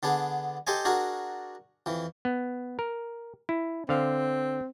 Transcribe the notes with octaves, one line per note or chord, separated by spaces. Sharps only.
D3 B3 D4 G#4
G4 A4 C5 D#5 G#5
D4 F#4 G#4 A#4
F2 E3
B3
A#4
E4
D3 C4 F5